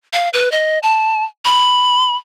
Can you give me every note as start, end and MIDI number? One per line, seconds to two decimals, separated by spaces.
0.13 0.29 77
0.33 0.51 71
0.52 0.79 75
0.83 1.24 81
1.45 2.16 83